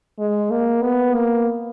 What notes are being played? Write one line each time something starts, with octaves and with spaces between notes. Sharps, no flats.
G#3
A#3
B3
A#3